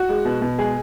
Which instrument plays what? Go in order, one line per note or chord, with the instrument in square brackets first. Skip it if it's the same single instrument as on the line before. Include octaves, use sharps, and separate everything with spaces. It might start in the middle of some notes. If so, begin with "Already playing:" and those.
Already playing: [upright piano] F#4
G#3
B2
B2
G#3 G#4